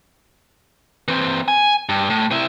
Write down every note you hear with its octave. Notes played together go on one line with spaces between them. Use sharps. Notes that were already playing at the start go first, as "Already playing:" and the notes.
E3 C4
G#5
G2
A2
C3 E4